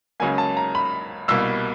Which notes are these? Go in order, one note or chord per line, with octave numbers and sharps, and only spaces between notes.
C#2 C#3 F#3 A#3 G#5
A5
A#5
B5
C2 B2 G3 A#3 E6